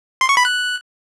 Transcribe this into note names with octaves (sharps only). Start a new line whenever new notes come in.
C6
C#6
B5
F#6